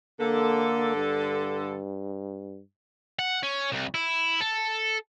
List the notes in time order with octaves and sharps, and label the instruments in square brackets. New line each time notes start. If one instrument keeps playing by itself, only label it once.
[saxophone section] D3 A4 [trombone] A#3
[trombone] G2
[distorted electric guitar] F#5
C#4
C2
E4
A4